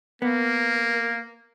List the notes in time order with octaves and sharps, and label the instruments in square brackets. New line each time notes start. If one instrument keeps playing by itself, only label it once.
[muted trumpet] A#3 [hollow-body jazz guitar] B3 [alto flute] A#4